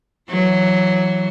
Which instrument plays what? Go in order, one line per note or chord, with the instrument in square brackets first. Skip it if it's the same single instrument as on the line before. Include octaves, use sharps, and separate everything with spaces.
[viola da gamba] E3 F#3